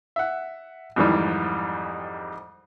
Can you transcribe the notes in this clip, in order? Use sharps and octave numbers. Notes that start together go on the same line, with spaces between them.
E5 F#5
F2 G#2 D#3 E3 G3